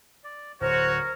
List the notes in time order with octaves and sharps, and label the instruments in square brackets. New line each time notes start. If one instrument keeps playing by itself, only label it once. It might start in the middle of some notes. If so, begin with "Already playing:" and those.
[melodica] D5
[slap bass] D1 [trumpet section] F#4 C#5 [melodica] A#4 [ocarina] C5